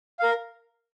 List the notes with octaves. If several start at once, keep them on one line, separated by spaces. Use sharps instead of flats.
A#4 F5